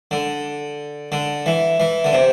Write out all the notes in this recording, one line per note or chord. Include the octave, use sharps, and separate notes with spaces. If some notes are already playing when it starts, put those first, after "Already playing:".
D3
D3
E3
E3
D3
C3